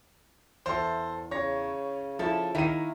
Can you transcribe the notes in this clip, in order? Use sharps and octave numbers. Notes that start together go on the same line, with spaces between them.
E2 A4 C5
C#3 C#5 A#6
F3 E4 A4
D#3 A#3 E4 D#7